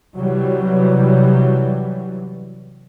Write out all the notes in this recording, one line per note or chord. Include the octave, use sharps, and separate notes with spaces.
C3 E3 F#3 G3